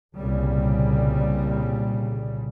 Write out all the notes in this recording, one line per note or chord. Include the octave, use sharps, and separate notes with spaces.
C2 A#2 C#3 G3